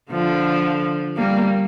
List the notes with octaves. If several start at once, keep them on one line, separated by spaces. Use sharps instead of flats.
D3 F3
G3 A#3